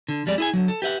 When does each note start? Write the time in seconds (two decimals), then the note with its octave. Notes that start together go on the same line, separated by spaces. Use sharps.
0.09 D3
0.26 F2 G3 G#3 D5
0.38 E4 G#4 G#5
0.54 D3 F#3
0.68 A4
0.82 G4 B4 E5 F#5